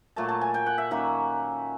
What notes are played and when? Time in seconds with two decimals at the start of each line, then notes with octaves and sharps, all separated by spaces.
0.16 A#2 F#3 A3 A5
0.29 A5
0.41 G#5
0.54 G5
0.66 F#5
0.78 E5
0.91 D#3 F#3 A#3 C#4 E5